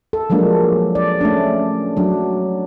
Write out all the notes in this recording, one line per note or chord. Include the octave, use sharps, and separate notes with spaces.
A4
F3 F#3 G#3 A#3 D4
D5
A3 C#4 D4
F#3 D4